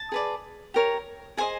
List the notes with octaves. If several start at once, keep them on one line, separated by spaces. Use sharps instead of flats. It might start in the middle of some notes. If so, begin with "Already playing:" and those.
Already playing: A5
G#4 B4 D5
G4 A#4 C#5
G#4 C5 D#5 G#5